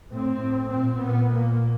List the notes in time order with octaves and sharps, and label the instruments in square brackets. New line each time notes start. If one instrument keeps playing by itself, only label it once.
[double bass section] A2 C4
A2
A#2 C4
A#2 B3
A#2 A#3